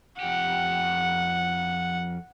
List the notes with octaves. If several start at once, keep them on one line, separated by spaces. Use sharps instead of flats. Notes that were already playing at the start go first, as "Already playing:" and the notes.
F2 G4 F#5